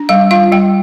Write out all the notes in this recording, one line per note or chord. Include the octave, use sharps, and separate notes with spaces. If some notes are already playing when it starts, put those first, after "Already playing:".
Already playing: D4
G3 F5
F4 F5
G3 G5